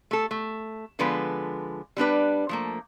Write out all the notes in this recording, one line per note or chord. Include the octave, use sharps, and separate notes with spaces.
A3 A4
A3
D3 F3 G#3 B3 B4
G3 B3 D4 B4
F3 A3 A#3